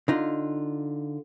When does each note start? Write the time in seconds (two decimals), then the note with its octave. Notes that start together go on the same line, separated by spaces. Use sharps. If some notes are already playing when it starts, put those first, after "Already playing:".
0.08 D3 D#4 F4